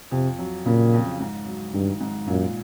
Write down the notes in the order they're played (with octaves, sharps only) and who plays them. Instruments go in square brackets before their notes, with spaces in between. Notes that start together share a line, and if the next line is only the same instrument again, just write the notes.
[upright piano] F2 [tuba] C3
[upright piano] F#3
[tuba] A#2 [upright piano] C#3
[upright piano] F2
G#2
F#3
[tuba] G2 [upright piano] D#3
[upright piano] G#2
[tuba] F#2 [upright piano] A#2